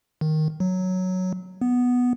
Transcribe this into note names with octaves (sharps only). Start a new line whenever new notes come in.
D#3
F#3
B3